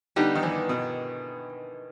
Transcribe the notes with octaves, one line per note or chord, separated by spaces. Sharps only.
D3 G3 B3 D#4 G4
D#3
E3
B2